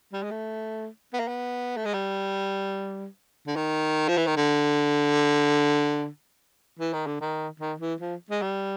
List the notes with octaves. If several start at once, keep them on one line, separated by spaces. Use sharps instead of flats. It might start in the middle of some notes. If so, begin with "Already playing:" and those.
G3
G#3
A3
B3
A#3
B3
A3
G#3
G3
D3
D#3
F3
E3
D#3
D3
E3
D#3
D3
D#3
D#3
E3
F3
G#3
G3